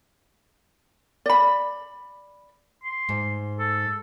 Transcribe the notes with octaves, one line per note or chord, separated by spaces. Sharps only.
D5 B5
C6
G#2
A4